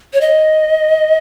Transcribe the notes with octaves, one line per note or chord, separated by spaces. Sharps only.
C#5
D#5